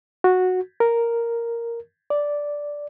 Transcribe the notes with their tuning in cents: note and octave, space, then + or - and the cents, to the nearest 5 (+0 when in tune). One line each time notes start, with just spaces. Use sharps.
F#4 -10
A#4 +0
D5 -5